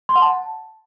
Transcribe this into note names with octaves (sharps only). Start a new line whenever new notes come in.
C6
F#5
A5